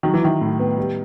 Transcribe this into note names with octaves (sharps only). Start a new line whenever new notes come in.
D#3 F#3
E3
D#3 E4
A2
B3
G3